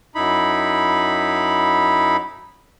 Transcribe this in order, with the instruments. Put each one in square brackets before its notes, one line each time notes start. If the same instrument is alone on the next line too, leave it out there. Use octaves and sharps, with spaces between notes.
[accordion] F#2 D#4 E4 B5